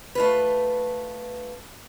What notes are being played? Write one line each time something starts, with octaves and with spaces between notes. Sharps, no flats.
A3 F4 B4